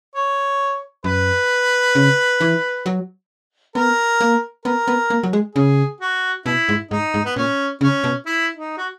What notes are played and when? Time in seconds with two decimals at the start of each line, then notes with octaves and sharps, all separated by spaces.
0.15 C#5
1.04 F#2 B4
1.95 C#3
2.41 E3
2.86 F#3
3.75 B3 A#4
4.21 A#3
4.65 B3 A#4
4.88 B3
5.10 A#3
5.23 F#3
5.33 G#3
5.55 C#3 G#4
6.01 F#4
6.46 B2 E4
6.69 G#2
6.91 G#2 D#4
7.14 G#2
7.25 B3
7.36 A#2 C#4
7.81 C#3 C#4
8.04 B2
8.26 E4
8.56 D#4
8.77 F#4